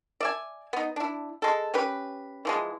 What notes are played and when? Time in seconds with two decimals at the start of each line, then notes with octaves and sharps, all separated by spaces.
0.20 D5 E5 G#5
0.73 B3 D#4
0.96 D4 E4
1.42 G#3 A4
1.74 C#4 G4 B4
2.45 E3 F3 G#3